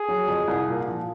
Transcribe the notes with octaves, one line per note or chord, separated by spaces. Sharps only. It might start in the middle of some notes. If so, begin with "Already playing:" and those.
Already playing: G#4
F#3
F2
C2
A#2
F3